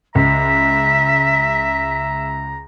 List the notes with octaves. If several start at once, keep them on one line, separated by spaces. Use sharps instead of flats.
C#2 E5 A#5 B6